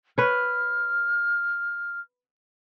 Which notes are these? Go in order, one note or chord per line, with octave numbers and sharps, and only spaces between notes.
B4 C#5 F6